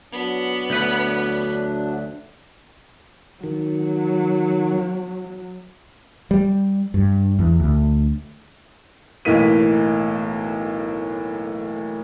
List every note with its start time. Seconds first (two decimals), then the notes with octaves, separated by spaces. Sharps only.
0.12 F#3 B3 D4
0.70 D2 B4
3.44 D#3 F#3
6.31 G3
6.94 G2
7.39 E2
7.60 D2
9.25 B1 A2 E3 A#3 B6 D#7